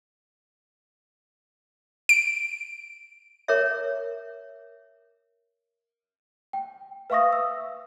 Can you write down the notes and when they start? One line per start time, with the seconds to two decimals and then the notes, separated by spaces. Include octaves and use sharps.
2.09 D7
3.48 A#4 C#5 E5
6.53 G5
7.10 B4 E5 F5 C#6 D#6 A#6
7.33 E6